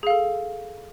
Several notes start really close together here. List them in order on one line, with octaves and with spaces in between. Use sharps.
G#4 F5 A4